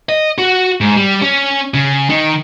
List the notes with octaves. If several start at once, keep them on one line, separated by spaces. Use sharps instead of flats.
D#5
F#4
G#2
G3
C#4
C#3
D#3